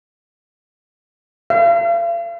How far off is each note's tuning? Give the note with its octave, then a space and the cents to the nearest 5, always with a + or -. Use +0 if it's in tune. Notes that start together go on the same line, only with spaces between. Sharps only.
F5 -40